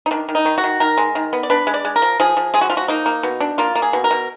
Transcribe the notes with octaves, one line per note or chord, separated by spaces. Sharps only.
D#4
D#3 D4
D#3
D#4
D#3
F#4
D#3
D#3 A#4
G#3
D#3
B3
D5
D4 B4
G#3
D5
G#3
A#4
F3
F3 G#4
F3
G#3 G#4
F#4
F3 F4
F#4
A#3 D#4
A#3
B2
D4
A#3 F4
A#3
G#4
B2
A#4
B2